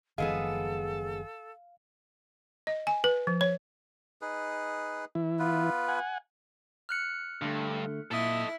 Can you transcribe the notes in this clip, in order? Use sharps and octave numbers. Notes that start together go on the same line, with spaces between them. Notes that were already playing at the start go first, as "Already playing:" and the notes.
F#1 D#3 F3 G#3 B3 G#4 A4 F5
D#5
G#5
B4
F3
C#5
D#4 G#4 B4
E3 E4
B3 F4 B4
F#5 G#5
F6 F#6 C#7
G2 D3 A3
A#2 E4 A4 D#5